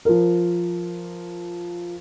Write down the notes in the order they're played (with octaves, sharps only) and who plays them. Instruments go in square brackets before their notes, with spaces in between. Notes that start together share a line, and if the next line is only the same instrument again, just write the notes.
[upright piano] F3 A#4